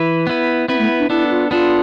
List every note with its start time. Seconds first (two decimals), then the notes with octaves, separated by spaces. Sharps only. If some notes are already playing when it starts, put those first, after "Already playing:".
Already playing: E3 E4 B4
0.27 B3 E4 B4
0.68 B3 C4 E4 B4
0.79 A3
0.99 D4
1.10 B3 D4 E4 A4
1.30 F4
1.51 B3 D4 F4 A4